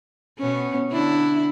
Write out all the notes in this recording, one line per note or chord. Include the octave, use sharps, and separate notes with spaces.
B2 B3 C#4
D3 D4 E4